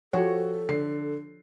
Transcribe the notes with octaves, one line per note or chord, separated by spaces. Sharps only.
F3 F#4 G4 A4 C#5
D3 C7